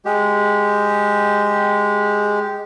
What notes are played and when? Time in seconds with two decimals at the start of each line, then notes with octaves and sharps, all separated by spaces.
0.05 G#3 G4